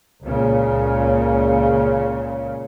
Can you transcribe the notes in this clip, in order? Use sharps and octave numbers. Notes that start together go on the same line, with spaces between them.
C#2 A#2 C#3 C#4